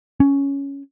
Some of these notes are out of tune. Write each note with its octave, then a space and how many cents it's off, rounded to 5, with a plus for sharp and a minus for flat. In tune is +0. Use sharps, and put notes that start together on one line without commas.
C#4 +5